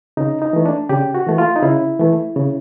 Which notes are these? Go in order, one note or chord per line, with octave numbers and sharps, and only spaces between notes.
C#3 D#4
D#4
E3 A3
D4
C#3 G4
F#4
E3 A3
F4
D#4
C#3 E4
E3 A3
C#3